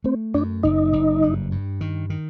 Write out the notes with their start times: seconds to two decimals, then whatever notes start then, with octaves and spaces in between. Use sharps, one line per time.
0.04 A3 C4
0.34 F#2 D4
0.63 F#1 D#4
0.93 F#1
1.22 G2
1.51 G2
1.81 D#3
2.10 D#3